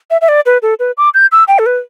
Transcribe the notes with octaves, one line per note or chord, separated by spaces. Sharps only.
E5
E5
D5
B4
A4
B4
D6
G6
E6
G5
A4
B4